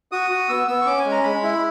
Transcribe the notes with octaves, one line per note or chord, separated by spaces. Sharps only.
F#4 D#6
F#4
B3 E6
B3 E6
C#6
C#4 D6
G#5
G#3
A#5
G#3 B5
E4